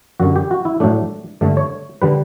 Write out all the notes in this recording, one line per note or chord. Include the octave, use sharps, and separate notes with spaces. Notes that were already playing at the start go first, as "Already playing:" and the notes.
F#2 D3 G3 F#4
G4
F#4
E4
A2 F#3 A3 D4
G2 D3 A3
C#5
D3 G3 B4